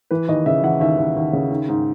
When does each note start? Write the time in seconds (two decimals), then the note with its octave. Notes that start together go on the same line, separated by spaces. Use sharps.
0.11 E3 B4
0.28 D#2 D#5
0.46 C#3 E5
0.63 E3 F#5
0.80 D#2 E5
0.98 D#2
1.16 D#2
1.33 C#3
1.50 D#3
1.68 G#2